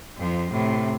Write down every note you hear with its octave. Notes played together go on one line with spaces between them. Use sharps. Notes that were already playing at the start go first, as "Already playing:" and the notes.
F2 F3
A2 C3